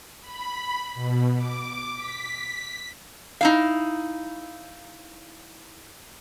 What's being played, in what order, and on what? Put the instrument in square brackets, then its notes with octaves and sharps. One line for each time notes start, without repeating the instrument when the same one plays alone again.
[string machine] B5
B2
D6
B6
[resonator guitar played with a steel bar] D#4 E4 F5